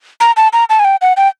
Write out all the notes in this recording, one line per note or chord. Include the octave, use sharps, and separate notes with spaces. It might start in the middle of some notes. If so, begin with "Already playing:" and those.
A#5
A5
A#5
A5
G#5
G5
F#5
G5